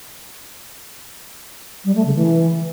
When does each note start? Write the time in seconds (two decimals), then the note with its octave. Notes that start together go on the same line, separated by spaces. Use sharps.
1.84 G3
1.95 A3
2.05 C#3
2.15 E3